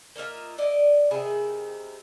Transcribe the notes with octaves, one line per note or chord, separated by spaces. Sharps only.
A#3 D#4 F4 E5
E4 D5 D#5
C3 D#3 E4 G#4